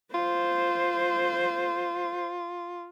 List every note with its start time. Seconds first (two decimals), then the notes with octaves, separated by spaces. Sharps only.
0.14 F4 C5